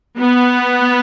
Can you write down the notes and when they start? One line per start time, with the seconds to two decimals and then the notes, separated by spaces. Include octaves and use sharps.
0.19 B3